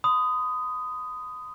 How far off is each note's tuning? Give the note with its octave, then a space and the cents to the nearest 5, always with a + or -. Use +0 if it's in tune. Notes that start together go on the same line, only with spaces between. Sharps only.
B5 +45 D#6 +0